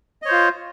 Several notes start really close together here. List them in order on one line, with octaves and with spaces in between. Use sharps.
D#5 C#5 C5 F4